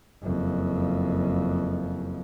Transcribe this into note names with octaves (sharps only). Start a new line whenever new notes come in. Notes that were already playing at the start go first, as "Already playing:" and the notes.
F#1 F2